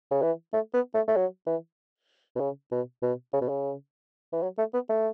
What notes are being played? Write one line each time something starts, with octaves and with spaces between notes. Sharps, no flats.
C#3
E3
A3
B3
A3
A3
F#3
E3
B2
C#3
B2
B2
C#3
B2
C#3
E3
F#3
A3
B3
A3